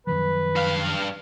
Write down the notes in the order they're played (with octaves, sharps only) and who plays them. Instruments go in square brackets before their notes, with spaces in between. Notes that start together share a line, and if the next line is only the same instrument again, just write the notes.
[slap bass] F#2 D#3 F3 [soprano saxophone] B4
[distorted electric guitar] G2 F5